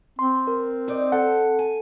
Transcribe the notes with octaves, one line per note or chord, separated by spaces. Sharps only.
C4 C6
A#4
D#4 D5
A4 F#5
G#5